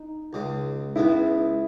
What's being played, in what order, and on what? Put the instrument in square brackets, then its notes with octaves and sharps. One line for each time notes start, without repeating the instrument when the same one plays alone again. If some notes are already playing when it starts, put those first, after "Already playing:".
Already playing: [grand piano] D#4
[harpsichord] C#2 C#3 G#3
[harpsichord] C#2 C#3 G#3 B3 [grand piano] E4